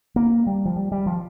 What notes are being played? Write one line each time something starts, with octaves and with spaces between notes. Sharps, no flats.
A#3
G3
F3
G3
G3
F3